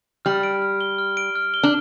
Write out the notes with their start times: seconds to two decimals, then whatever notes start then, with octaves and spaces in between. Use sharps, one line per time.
0.25 G3 F6
0.43 D7
0.62 F6
0.81 G7
0.98 F6
1.17 D7
1.35 F6
1.54 G7
1.63 D4